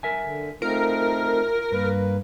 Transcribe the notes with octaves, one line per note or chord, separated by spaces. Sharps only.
A#4 E5 G#5
D3
A3 C4 D#4 F4 A#4
G2 A#3 B4